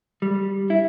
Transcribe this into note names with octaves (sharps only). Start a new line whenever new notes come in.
G3
E4